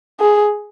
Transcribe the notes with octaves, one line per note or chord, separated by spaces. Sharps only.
G#4